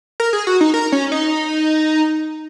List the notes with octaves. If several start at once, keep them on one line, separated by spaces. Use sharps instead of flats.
A#4
G#4
F#4
D#4
A#4
C#4
D#4